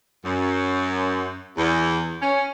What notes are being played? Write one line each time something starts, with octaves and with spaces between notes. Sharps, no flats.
F#2
E2
C#4